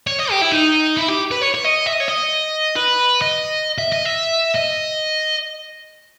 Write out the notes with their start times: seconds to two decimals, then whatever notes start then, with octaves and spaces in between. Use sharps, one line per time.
0.07 C#5
0.19 D#5
0.31 G4
0.41 E4
0.52 D#4
0.97 E4
1.08 G4
1.31 B4
1.42 C#5
1.54 C#5
1.65 D#5
1.87 E5
1.93 D#5
2.01 C#5
2.09 D#5
2.76 B4
3.22 D#5
3.78 E5
3.92 D#5
4.05 E5
4.55 D#5